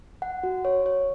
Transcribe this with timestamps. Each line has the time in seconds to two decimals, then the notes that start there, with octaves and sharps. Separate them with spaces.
0.22 F#5
0.43 F#4
0.65 C#5
0.86 C#5